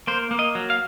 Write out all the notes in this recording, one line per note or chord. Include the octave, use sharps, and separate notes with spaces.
A#3 C5
A#3
D#5
F#3
F5